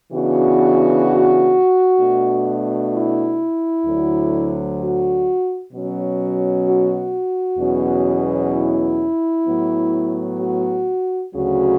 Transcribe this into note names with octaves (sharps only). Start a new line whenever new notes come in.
C#3 E3 B3 D4 F#4
B2 A3 D4
E4
D2 D3 F#3
F#4
B2 F#3 C#4
F#4
E2 B2 F#3 C#4
E4
A2 F#3 B3
F#4
D2 C#3 F#3 F#4